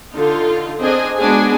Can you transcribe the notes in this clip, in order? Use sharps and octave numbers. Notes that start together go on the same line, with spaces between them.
D3 D#4 F4
C4 D4 G#4 D#5 G#5
G#3 B3 D4 F#4 G#4 G#5